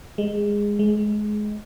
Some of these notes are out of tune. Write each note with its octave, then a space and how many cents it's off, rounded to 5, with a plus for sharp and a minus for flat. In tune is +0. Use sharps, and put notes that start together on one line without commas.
G#3 -15
G#3 +20